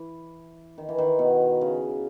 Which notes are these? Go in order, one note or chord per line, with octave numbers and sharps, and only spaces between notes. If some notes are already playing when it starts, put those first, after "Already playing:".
Already playing: E3
D#3
E3
D#3
B2
C#3